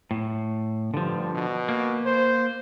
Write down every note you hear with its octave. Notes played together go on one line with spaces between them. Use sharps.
A2
G2 D3 F3
B2
A#3
C5